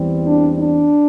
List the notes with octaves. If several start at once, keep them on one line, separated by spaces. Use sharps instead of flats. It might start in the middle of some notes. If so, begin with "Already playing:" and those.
Already playing: E2 E3 G3 C4
D4
D4